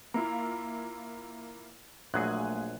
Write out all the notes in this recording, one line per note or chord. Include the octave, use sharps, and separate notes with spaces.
A#3 E4 F4 A#5
A#1 F#3 A3 A#3 G#4 G#5 C6 F#6